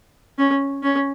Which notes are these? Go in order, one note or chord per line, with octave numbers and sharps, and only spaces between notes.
C#4
C#4